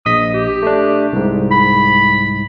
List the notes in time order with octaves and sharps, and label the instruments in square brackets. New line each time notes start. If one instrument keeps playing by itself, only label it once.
[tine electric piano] A#1 D#5 B6 [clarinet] D#6
[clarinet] G4
[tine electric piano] A3 D4
C2 G#2
[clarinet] B5